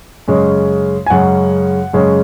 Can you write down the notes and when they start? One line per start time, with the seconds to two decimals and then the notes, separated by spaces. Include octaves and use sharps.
0.28 F#2 C#3 G#3 C#4
1.06 G#5
1.10 F#2 C#3 G#3 C#4 F#5
1.93 F#2 C#3 G#3 C#4